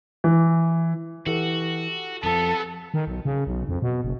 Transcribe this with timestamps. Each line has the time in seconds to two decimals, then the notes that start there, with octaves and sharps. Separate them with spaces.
0.24 E3
1.26 E3 F#4 G4 A4 F#5
2.23 F2 F3 B3 A4
2.94 D#3
3.07 B1
3.25 C#3
3.47 B1
3.68 F2
3.82 B2
4.04 F#1